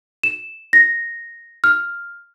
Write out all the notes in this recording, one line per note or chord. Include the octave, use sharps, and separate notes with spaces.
E7
A#6
F6